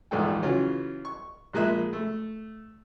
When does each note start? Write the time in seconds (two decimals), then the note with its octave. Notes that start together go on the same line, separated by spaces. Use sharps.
0.11 A#1 E2 G#2 A4 G5
0.42 C#3 E3 F#3 C#4 F4
1.05 C#6
1.53 A#1 F3 G#3 A#3 E5 F#6
1.93 A3